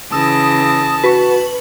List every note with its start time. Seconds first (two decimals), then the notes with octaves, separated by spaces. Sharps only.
0.12 C#3 E3 A5 D#6 E6 A#6
1.04 F#4 B4 C#6